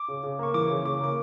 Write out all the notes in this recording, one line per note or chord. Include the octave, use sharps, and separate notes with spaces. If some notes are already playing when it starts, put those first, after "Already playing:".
Already playing: D6
C#3
C#3
A#3 C#6
E3 D6
C#3
C#3 D6
A#3 D6